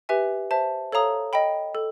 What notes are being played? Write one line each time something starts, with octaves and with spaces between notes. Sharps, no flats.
G4 B4 E5 G#5
C5 E5 A5
A4 C#5 F5 A#5 D#6
D#5 G5 B5
A4